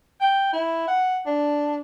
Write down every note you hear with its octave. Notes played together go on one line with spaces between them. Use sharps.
G5
E4
F#5
D4